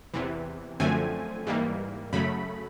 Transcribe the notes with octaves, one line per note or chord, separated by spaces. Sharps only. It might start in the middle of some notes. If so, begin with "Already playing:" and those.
E2 C3 E3
F#2 D3 F3 A3 C4 G#5
G#2 E3 G3 A#3
F#2 C#3 F#3 A3 B5